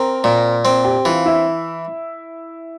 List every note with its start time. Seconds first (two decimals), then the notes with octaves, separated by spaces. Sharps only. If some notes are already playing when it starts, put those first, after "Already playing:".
Already playing: C4 A#4 A#5
0.24 A#2
0.65 C4
0.84 G4 G5
1.05 E3 F4 F5
1.26 E4 E5